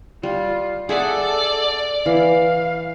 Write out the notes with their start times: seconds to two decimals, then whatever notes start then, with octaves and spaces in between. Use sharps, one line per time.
0.23 G3 F4
0.89 G#4 A4 D5 E5 F#5
2.06 E3 F5